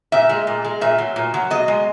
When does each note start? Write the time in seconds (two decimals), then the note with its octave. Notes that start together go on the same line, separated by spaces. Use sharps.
0.12 A#2 E5
0.29 G#3
0.47 A#2
0.64 G#3
0.81 A#2 E5
0.98 F#3
1.16 A#2
1.34 F#3
1.50 B2 D#5
1.68 G#3